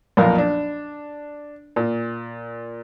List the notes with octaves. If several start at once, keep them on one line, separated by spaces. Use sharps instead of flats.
B1 F2 A#2 A#4 F5
D4
A#2